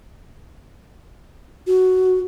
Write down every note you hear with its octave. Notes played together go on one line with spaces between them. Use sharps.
F#4